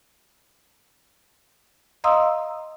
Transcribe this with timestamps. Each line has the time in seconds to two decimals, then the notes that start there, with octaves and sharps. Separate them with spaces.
2.04 D#5 F5 A#5 C6 D#6 E6